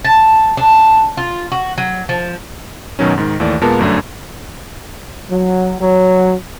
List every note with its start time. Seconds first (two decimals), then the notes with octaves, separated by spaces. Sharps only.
0.04 A5
0.57 D4
1.17 F4
1.52 F#4
1.78 F#3
2.09 F3
2.99 F#2 B2 D#3 F#3 C#4
3.18 G#2 D#3
3.40 D#2 E3 A3 D5
3.61 A#2 G#3 A#3 B3 A#4 A5
3.79 G1 F#2 A3 D4
5.30 F#3
5.81 F#3